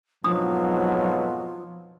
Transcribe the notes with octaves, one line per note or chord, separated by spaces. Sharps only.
F2 G#2 B2 F3 F#3 D4 D#6